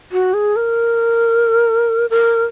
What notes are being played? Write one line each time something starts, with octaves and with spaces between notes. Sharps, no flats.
F#4
G#4
A#4
A#4